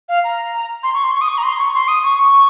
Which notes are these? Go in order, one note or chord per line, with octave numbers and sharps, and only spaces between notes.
F5
A#5
C6
C#6
C6
C#6
D#6
C#6
A#5
C6
C#6
C6
D#6
C#6